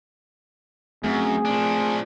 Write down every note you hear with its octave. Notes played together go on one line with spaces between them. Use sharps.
F#2 A3 C4 G#4
F3 D4